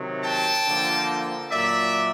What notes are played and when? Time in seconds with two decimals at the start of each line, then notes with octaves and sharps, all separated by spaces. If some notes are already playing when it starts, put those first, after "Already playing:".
Already playing: C3 D#3 F#3
0.24 G5 A5
0.66 D3 F3 A#3
1.50 A#2 F#3 A#3 D5 E5